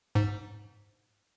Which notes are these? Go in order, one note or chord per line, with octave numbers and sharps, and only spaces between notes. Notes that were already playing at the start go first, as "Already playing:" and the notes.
G#2